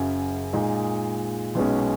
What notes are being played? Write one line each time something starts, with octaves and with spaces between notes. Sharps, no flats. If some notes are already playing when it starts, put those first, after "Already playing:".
Already playing: F#1 F#2 C#3 F#3
A#2 G#3 D#4
B1 B2 G#3 C#4